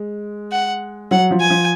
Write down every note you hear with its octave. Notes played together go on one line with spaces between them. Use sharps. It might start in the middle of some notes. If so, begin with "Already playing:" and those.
Already playing: G#3
F#5
F#3 F#5
F3
G#5
F3